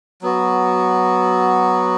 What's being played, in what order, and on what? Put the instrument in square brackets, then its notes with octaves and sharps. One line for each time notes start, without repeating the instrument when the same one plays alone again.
[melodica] F#3 B3 F#4